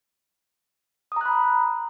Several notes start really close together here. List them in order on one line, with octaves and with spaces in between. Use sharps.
D#6 A#5 F#6 B5